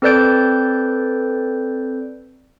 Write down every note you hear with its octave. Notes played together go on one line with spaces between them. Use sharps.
C4 A4 B4 D5 G6 D7